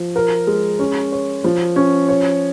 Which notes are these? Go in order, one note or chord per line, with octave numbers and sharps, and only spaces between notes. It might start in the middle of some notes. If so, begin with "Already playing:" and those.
Already playing: F3
A#4
G#3
C#4
C#5
F3
C#4
C#5